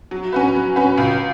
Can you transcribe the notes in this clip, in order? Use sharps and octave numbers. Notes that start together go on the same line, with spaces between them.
F#3
C#4 F#4 B4
F#3
C#4 F#4 B4
C#2